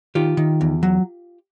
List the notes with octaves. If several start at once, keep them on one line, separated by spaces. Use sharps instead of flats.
D#3 F4 G4
D#3
E2
F#3